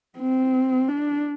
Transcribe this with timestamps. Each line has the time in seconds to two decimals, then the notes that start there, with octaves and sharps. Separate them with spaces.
0.18 C4
0.88 D4